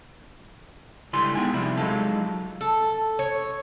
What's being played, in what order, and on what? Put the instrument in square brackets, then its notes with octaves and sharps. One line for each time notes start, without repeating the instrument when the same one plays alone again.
[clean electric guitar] C#2 D3 G3 E4 G#5 C6
G#3 B3 D#4 G5 G#5
C3 F3 G3 E4
F#3 G#3 A3 D#4 F4 A4
[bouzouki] A4
C#5